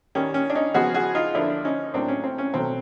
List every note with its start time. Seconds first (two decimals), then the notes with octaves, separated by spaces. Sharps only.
0.15 D#3 G3 A#3 C#4
0.34 C#4
0.50 D4
0.55 C#4 D#4
0.74 C#3 F3 G#3 B3 F#4 G#4
0.94 F#4 G#4
1.15 D#4 F4
1.34 D3 F3 A#3 D4 E4
1.64 C#4 D#4
1.94 A2 F#3 A#3 C4 D4
2.09 C#4
2.24 C4
2.38 C#4
2.54 B2 F#3 A3 C4